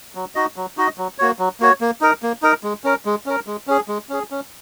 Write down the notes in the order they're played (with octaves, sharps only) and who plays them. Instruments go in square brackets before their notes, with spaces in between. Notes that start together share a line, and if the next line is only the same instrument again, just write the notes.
[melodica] F#3
D#4 F#4 D#5
F#3
D#4 F#4 D#5
F#3
A#3 F#4 C#5
F#3
A#3 F#4 C#5
A#3
D#4 A#4
A#3
D#4 A#4
G#3
C#4 A#4
G#3
C#4 A#4
G#3
C#4 G#4
G#3
C#4 G#4
C#4